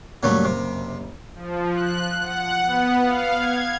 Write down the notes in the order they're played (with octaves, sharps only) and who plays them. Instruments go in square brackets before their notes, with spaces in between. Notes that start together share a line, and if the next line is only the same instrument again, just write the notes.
[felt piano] F#1 A#3 [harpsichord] F#3 G3 A3
[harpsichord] C3
[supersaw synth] F3
F#6
F#5
B3
F5
G#6